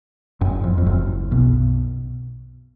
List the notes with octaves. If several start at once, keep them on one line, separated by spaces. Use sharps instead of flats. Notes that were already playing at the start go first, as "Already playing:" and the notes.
F#1 F#2
F2
F2
F#1 F#2
B1 B2